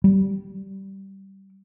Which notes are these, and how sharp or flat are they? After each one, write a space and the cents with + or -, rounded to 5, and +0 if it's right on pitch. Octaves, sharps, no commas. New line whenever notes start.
G3 -15